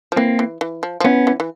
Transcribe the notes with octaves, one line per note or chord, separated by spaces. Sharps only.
F3
E3 A#3 C4
E3
E3
F3
F3
E3 B3 C#4
E3
E3